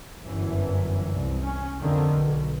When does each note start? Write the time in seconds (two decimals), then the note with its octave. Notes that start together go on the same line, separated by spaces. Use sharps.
0.24 G1 F#2 E3
1.14 C2
1.44 C#4
1.82 F2 D3 D#3
2.11 B1